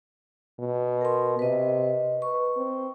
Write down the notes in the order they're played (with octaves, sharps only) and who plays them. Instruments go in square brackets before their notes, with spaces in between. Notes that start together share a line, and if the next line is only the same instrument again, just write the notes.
[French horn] B2
[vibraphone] A#4 C6
[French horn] C3 [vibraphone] B4 D#5
[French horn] B4 [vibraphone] C#6
[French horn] C4